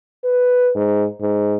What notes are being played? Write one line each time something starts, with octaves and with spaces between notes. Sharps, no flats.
B4
G#2
G#2